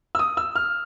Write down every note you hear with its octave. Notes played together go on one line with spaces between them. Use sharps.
E6
D#6
E6
F6